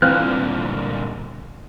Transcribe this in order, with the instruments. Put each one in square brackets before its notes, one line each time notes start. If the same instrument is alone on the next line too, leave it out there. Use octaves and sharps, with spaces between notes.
[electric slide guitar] G2 A#2 D3 [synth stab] E3 C4 F4 [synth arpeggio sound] F6 F#6